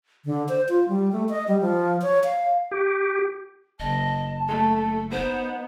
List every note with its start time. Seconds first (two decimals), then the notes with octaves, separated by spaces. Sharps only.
0.25 D3
0.49 C5
0.69 F4
0.88 G3
1.12 A3
1.29 D#5
1.48 G3
1.61 F3
2.02 C#5
2.24 F5
2.71 G4
3.80 F#1 D#5 A5
4.48 A3 A4
5.11 B3 D#4 C5